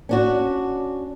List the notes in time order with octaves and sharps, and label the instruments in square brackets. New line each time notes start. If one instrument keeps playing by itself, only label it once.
[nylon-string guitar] C#4 D4 F#4